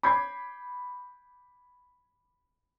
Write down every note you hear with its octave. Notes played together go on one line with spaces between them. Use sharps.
B5 D6 G6 G#6 C7